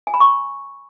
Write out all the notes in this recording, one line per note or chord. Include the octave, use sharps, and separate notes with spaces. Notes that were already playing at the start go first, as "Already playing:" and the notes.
G#5
B5
C#6